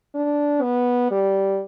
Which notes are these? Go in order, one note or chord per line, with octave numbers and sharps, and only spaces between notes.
D4
B3
G3